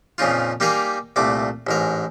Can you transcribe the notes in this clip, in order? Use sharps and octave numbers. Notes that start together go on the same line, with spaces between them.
F2 A#2 C#3 D#4 F4
G3 A#3 D#4 G4 G#4 A#4
C2 A#2 A3 D6
A1 G#2 A#4